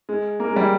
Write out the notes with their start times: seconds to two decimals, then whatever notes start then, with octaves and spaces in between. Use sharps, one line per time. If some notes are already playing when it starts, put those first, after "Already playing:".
0.09 G#3
0.40 A#3
0.48 G#3
0.56 G3